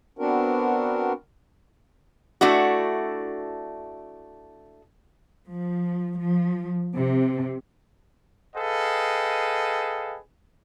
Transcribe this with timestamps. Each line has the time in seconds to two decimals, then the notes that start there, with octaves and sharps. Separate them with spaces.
0.19 B3 C4 D4 F#4 A#4
2.41 A3 D4 E4 F#4
5.51 F3
6.19 F3
6.94 C3
8.56 G#4 A4 B4 D#5 F5 G5